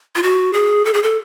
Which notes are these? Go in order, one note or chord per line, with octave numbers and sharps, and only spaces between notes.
F4
F#4
G#4
A4
G#4
A4